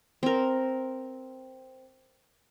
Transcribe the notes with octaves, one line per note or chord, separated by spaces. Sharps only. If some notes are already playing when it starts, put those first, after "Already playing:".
C4 A#4